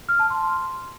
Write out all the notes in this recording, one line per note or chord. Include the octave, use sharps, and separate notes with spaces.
F6
A5
C6